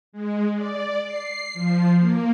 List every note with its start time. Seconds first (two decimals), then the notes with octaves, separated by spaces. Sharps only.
0.12 G#3
0.54 D5
1.06 C7
1.54 F3
1.99 A#3